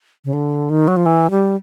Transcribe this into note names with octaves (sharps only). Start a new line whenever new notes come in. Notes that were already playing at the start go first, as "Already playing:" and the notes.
C#3
D3
D#3
F#3
F3
E3
G3